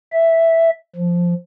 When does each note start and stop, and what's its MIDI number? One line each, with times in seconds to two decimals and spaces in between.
0.13 0.70 76
0.95 1.34 53